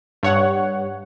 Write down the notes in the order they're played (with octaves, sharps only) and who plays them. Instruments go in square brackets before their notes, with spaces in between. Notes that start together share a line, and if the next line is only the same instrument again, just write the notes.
[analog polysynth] G2 C#5 F#5